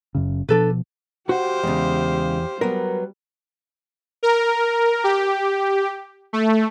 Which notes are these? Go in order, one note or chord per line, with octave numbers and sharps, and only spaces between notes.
F#1 F#2 C#3
B2 F3 D4 A4 B4
F#4 G4 C5 F5 F#5
E2 C#3 G#3
F#3 G3 B3 A#4
A#4
G4
A3